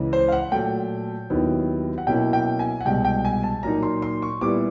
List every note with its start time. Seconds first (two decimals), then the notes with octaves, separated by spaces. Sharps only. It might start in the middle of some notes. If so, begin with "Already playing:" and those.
Already playing: C#2 C#3 E3
0.13 C5
0.28 F5
0.32 F#5
0.52 A#2 F#3 A3 G5
1.30 D#2 D#3 F#3 B3 E4
1.98 F#5
2.07 B2 F#3 A#3 C#4 E4 G5
2.33 G5
2.59 G#5
2.81 F#5
2.85 C2 B2 G#3 G5
3.05 G5
3.25 G#5
3.43 A5
3.63 A#2 F#3 A#3 D#4 A#5
3.83 C6
4.02 C6
4.22 C#6
4.41 A#2 G3 B3 E4 D6